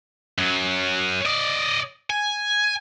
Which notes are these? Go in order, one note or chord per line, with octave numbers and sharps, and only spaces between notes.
F#2 F#3
D5 D#5
G#5